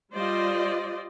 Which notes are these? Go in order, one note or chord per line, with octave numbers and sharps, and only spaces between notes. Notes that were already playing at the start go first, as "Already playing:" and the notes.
G3 F4 C5 D5 D#5